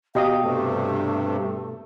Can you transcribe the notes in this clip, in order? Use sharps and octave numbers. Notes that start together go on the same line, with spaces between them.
B2 G4 D#5 F5
G2 C3 A3